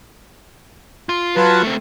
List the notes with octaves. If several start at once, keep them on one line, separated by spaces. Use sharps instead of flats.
F4
F#3 F4 B4 A5
A3 C4